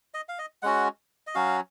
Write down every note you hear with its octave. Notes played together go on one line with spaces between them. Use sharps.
D#5
F5
D#5
G#3 C#4 F#4 F#5
D#5
F#3 C#4 F#4 F5